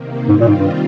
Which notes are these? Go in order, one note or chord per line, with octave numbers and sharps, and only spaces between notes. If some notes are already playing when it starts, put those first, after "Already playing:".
Already playing: C3 D#3 A#3
G#2 D#3 G3 C4 F4
A#2
G#2
G2